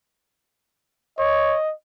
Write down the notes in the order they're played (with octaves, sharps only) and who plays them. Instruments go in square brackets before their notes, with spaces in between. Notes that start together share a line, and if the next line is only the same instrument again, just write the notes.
[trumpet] C#5 [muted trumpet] D#5